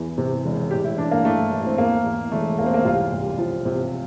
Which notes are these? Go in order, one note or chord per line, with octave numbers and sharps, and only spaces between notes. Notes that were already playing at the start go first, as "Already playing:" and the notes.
Already playing: E2 E3
C3
E1
A2 G4
E4
E3 D4
A#3
E3 A3
A1
C4
E2 A#3
E2
E1 A3
E2 A#3
C4
A#3
C2 F4
C2
F3
C3